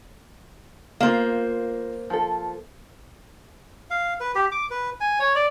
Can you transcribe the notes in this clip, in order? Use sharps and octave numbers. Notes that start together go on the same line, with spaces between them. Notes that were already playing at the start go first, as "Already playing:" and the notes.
A#3 F4 C5 F5
F3 A4
F5
B4
G4
D6
B4
G#5
C#5
D5